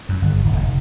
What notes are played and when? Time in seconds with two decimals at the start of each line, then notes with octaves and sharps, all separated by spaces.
0.09 F#2
0.22 G1
0.45 D1
0.57 F1